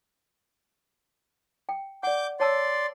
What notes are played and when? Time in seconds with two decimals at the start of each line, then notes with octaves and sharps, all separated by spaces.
1.69 G5
2.03 D5 F#5 D6 G6
2.40 C#5 D5 A5 C6 E6